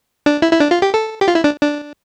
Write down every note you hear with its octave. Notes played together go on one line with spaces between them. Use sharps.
D4
E4
E4
D4
F4
G4
A4
G4
F4
E4
D4
D4